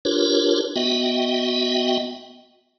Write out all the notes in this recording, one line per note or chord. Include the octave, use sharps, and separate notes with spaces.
D4 F4 G4 A#4 B4 C#5
B3 F#4 D#5 E5 G5